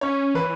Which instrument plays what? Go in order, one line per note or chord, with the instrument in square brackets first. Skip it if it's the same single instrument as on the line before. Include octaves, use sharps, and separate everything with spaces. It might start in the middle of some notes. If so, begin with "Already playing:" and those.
[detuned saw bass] C#4 [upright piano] C#5
[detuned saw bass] E3 [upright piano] B4